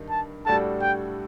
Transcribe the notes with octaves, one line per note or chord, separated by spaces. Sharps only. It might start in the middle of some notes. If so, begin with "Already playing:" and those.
Already playing: G2 D#3
A5
A2 G3 D4 F#4 A4 A5
G5